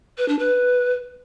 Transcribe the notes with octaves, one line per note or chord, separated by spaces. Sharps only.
B4
D4
B4